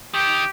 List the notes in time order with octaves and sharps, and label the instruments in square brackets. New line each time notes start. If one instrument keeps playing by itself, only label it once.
[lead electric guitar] D#3 [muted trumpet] G4